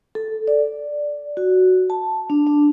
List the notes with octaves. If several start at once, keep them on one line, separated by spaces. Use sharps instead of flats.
A4
D5
F#4
A5
D4
D4